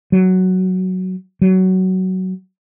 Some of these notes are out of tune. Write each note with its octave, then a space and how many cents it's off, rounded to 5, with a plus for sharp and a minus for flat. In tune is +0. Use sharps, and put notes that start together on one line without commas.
F#3 +5
F#3 +15